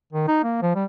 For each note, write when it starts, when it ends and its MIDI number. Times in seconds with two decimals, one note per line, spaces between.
0.13 0.28 51
0.28 0.39 63
0.44 0.57 58
0.62 0.72 53
0.75 0.84 55